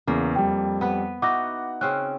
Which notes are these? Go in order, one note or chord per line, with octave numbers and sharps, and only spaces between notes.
E2 C#3 A#3
F2 G3 G5
B3 B4
D#4 E4 F#4 F#5 D6 A#6
C#3 C4 C#4 F#6